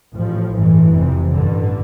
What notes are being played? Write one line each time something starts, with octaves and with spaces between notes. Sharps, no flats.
A1 A2 F3
A1 G2 E3
F1 F2 C3
A1 G2 D3